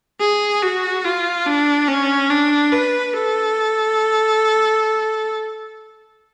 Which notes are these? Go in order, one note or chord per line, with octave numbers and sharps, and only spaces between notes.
G#4
F#4
F4
D4
C#4
D4
B4
A4